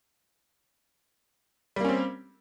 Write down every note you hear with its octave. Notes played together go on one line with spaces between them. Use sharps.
G3 A#3 C4 C#4